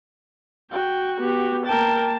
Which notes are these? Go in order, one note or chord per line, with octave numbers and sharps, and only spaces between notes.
F#4 G5
B3 G4
A#3 A#4 G5 A5